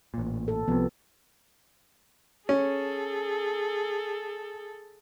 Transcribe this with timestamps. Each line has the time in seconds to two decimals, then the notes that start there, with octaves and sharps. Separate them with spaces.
0.14 A1 A#2
0.48 A4
0.68 C2 C3 F3 B3
2.49 C#4 G#4 A4